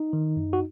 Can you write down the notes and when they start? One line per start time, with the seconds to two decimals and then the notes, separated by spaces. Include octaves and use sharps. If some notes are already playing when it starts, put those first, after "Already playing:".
Already playing: D#4
0.13 D#3
0.36 F#2
0.53 F#4